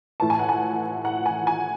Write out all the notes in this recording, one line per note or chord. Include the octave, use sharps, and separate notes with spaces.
A2 E3 A5
G#5
F#5
G#5
F#5
G#5
G#5